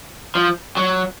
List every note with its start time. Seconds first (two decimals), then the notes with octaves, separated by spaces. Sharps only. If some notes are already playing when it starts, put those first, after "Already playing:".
0.35 F3
0.77 F#3